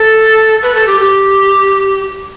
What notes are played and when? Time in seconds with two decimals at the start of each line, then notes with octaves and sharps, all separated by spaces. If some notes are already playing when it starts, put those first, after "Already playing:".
Already playing: A4
0.63 B4
0.74 A4
0.87 G4
1.00 G4